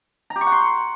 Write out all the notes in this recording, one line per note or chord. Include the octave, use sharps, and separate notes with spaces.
A#5
G4
C#6
F#5
C6